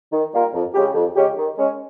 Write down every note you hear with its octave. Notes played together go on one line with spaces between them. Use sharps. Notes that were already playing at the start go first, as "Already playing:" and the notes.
D#3
G3 A#3 F4 A#4
F2
C#3 G#3 C#4 G4
F2
C#3 G#3 C#4 G4
D#3
G#3 C#4